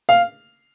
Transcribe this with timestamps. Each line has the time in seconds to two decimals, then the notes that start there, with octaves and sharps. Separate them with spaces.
0.09 F5